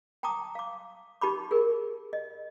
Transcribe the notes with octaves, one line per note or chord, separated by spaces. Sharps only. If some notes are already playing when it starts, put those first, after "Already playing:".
G5 A5 A#5 D6 D#6
F5 D6
D#4 G4 A5 B5 D6
G#4 A#4
D#5